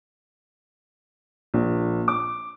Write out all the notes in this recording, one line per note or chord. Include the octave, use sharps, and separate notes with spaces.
A#1
D6